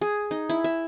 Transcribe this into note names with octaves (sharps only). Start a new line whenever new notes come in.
G#4
D#4
E4
E5